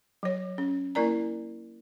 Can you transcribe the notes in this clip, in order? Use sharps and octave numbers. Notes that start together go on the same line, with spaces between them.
F#3 C#5
C#4
A#3 E4 A#4 D5 A#5